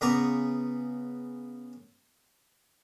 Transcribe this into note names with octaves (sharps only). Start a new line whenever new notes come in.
C#3 B3 B4 A#5 C#6 D6